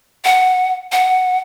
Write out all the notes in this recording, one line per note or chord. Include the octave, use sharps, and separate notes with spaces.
F#5
F#5